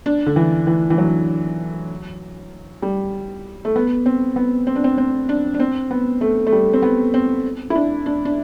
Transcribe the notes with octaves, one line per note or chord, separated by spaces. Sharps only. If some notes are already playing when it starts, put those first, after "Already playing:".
D4
D3
E3
E3
E3
F#3
G3
A3
B3
C4
B3
C4
D4
C4
C4
D4
D4
C4
B3
A3
A3
G3
C4
B3
C4
E4
D4
D4
D4